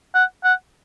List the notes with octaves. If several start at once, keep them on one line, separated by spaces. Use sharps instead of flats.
F#5
F#5